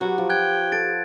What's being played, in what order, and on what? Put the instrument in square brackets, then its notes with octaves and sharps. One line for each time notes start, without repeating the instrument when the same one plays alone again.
[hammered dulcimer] F#3 B4 [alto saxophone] F#4 [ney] G4
[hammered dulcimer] F3
[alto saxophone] G5 [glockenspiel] F#6 G#6
[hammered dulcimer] A4 [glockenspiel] A6 D7